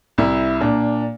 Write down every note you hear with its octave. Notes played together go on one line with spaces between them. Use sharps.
C2 E4
A#2 D4